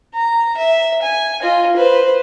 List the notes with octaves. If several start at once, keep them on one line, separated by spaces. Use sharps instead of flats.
A#5
E5
G#5
F4 D#5
B4 C5